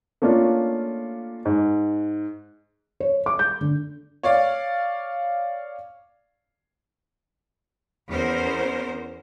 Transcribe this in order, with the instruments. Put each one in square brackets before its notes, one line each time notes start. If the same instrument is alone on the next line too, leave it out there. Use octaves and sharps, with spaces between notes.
[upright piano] A3 A#3 C#4 D4 F4
G#2
[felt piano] C#5
D6
G6
D3
[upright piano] C#5 D5 F5
[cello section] E2 C#4 A#4 C5